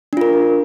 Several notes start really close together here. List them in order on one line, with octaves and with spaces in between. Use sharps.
D4 F4 A#4